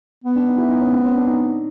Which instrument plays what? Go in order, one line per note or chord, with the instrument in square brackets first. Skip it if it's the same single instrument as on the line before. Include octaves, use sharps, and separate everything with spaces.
[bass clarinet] B3
[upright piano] D4
D#4
E4
D#4
C#4
C4
C#4
D4
D#4